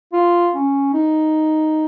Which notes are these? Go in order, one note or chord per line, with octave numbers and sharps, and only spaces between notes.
F4
C#4
D#4